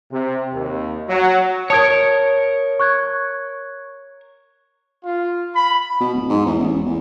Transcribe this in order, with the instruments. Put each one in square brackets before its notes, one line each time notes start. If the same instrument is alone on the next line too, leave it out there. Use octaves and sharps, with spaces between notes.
[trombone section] C3
D#2
F#3
[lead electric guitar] A#4 C#5 [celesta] A5 D#6 G#6
[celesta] C#6 F#6 G#6
[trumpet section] F4
B5
[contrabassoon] B2
D1
G#2
E2
A1
E1
E2